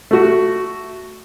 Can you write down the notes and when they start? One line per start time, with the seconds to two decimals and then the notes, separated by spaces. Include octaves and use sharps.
0.11 A3 F#4